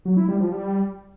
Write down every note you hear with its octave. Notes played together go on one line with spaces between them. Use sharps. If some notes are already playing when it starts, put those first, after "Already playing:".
F#3
E4
G3
F3
G3